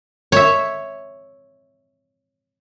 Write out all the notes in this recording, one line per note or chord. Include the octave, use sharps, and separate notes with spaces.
C#5 E5